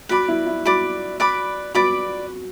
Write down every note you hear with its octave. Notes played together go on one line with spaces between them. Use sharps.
F#4 B4 D5 B5 D6
E4
E4
F#4 B4 D5 B5 D6
B4 D5 B5 D6
F#4 B4 D5 B5 D6